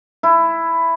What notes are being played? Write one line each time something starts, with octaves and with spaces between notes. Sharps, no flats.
E4